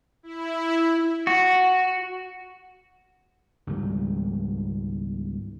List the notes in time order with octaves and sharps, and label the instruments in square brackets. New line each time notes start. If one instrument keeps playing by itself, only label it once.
[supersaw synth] E4
[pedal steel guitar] F#4
[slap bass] C#2 G#2 D#3 G3